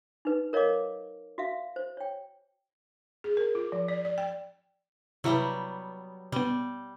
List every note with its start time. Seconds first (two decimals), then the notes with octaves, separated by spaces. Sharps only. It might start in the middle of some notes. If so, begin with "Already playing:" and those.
0.25 D#4 B4
0.53 A#4 C#5 D#5 F5 D6
1.38 F#4 E5 F5
1.76 C5
1.97 C#5 G5
3.24 G#4
3.37 A#4
3.55 F4
3.72 F3
3.88 D5
4.05 D5
4.18 G5
5.24 C3 F#3 G3 B3 E4 E5
6.32 B2 G3 B3